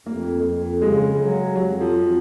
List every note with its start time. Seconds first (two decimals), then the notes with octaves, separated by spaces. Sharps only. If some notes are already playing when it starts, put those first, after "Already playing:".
0.06 F2 A#3
0.44 F2
0.81 C#3 G#3
1.18 F#3
1.55 F2 F#3
1.81 F3
1.93 F2